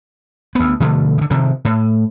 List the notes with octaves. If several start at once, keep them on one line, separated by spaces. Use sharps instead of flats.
D2 B3
B2 D3 F3 A3
D3 E3
C3 D#3 F3
A2